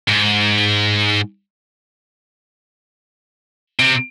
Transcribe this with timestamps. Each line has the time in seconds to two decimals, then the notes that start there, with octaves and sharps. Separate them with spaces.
0.09 G#2
3.80 C3